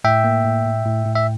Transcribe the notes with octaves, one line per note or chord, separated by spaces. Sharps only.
A2 E5 G5
A#3
A2
A2
A2
A2
E5